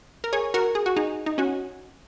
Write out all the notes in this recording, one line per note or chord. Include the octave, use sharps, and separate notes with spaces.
A#4
G#4 C#5
F#4 A#4
G#4
F#4
D#4 G#4
D#4
C#4 F#4